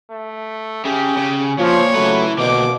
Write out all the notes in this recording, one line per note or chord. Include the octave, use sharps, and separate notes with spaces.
A3
C#3 G4
C#3
A#2 F3 C#5
C#3 F#3 A3 E4 B4
D2 B2 A#3 D6